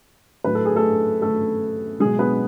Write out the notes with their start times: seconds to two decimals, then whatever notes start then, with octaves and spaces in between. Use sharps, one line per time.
0.44 A2 F#3 B4
0.55 A4
0.65 G#4
0.75 A3 A4
1.22 A3 A4
2.00 B2 F#3 G#3 G#4
2.19 B3 B4